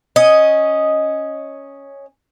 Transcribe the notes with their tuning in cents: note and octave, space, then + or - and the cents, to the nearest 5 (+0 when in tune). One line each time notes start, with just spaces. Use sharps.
C#4 +0 D#5 +0